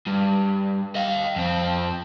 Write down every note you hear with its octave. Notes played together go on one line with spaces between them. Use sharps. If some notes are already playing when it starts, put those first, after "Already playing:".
G2
D#5 F5
F2 C4